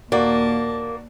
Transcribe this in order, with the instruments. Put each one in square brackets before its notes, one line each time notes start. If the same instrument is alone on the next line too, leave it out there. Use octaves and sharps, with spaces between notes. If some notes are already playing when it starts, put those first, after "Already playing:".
[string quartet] D#2 A#2 A5 [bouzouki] A#3 [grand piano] F#4 D5